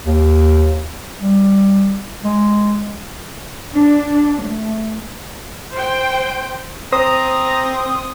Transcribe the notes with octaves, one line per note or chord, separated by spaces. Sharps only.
D#2
G3
G#3
D4
A3
C5 G5
C4 C5 A#5 D#6